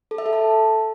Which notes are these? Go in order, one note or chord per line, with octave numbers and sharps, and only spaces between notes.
A4
E5
A4
A5